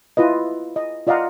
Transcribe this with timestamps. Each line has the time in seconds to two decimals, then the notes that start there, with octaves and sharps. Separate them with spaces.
0.17 E4 F4 B4 D#5
0.76 D#5
1.07 F4 D5 D#5 F5 F#5 A#5